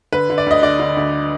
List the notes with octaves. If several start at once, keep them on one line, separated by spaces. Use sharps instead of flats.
D3 B4
D3
D5
D2 D#5
D3 D5
D3
D2